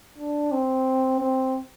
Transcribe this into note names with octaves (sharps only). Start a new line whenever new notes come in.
D4
C4
C4